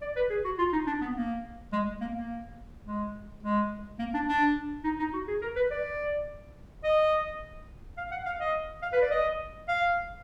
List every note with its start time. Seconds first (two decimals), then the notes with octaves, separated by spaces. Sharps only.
0.02 D5
0.16 B4
0.30 G#4
0.44 F#4
0.58 F4
0.73 D#4
0.87 D4
1.01 B3
1.16 A#3
1.72 G#3
2.01 A#3
2.15 A#3
2.86 G#3
3.43 G#3
3.99 A#3
4.14 D4
4.28 D4
4.84 D#4
4.99 D#4
5.13 F#4
5.28 G#4
5.41 A#4
5.56 B4
5.71 D5
6.84 D#5
7.98 F5
8.12 F#5
8.26 F5
8.40 D#5
8.82 F5
8.93 B4
9.02 D5
9.11 D#5
9.68 F5